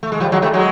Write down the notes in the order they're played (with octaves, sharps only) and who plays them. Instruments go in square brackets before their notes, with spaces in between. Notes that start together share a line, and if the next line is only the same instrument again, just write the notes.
[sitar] A3
G#3
F3 G3
F#3 G#3
G3 A3
F#3 G#3